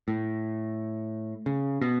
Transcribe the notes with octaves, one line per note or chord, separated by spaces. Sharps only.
A2
C#3
B2